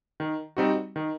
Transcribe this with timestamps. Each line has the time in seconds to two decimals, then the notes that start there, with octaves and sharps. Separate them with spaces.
0.20 D#3
0.57 G3 C4 D#4 F#4
0.96 D#3